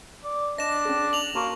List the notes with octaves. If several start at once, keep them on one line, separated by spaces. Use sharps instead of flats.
D5
D4 D#5 A#6 E7
C#4 G#4
F7 F#7
A#3 F#4 A5 C#6